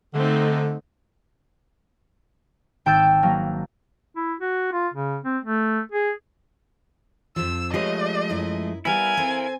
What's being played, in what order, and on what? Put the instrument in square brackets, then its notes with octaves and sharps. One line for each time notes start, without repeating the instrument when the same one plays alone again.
[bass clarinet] D3 [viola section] A3 C4 D#4
[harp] G#1 G5 A5 E6 G6 A6
F#3 A#3
[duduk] E4
F#4
F4
C#3
C4
A3
G#4
[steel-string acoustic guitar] F2 F3 [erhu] E6
[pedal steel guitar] F3 G#3 A3 [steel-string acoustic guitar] G4 B4 C#5 [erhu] D#5
[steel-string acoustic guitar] F#2 E4
[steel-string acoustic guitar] G3 B3 [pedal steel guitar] E4 A#4 F5 [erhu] G#5
[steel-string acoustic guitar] C4 A4 C5